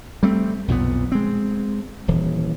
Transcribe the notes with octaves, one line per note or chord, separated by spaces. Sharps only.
G3 A3 C4
B1 F2 A#2 B3
G#3 C4
D#1 E3